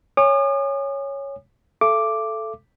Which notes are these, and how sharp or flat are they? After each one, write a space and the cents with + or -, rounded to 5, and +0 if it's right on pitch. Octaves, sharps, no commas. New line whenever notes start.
C#5 +0 G#5 -20 D#6 -45
A4 -5 E5 +40 D6 +0